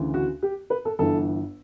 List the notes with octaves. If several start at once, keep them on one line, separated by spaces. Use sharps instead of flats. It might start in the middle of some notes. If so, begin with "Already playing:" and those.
Already playing: D2 C#3 E3
F#4
G4
B4
A4
G1 G2 E3 A4